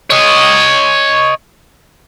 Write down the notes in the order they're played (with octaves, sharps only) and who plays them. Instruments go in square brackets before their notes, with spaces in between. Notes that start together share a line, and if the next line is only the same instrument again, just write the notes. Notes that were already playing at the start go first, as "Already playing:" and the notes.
[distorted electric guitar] C#5 D#5